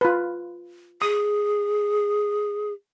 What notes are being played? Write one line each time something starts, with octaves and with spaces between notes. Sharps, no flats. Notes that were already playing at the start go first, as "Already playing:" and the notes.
F4 B4
G#4 D#6